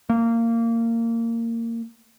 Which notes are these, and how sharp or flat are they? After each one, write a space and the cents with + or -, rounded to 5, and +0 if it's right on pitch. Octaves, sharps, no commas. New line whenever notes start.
A#3 -20